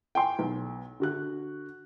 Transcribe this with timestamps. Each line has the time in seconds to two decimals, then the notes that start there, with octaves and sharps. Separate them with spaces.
0.15 G5 G#5 C6
0.39 B1
1.00 D3 F#4 F#6